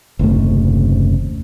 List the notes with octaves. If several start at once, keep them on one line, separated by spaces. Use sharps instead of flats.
F#1 D#2 C3 A3